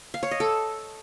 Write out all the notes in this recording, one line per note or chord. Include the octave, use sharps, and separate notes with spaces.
F5
C#5
D#5
A4